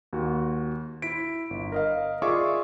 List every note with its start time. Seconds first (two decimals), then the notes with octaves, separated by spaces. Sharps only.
0.13 D#2 F#4
1.02 E4 B6 D7
1.50 G1
1.72 A#4 D#5 F5
2.22 F4 G#4 D5 E5 C#6 D6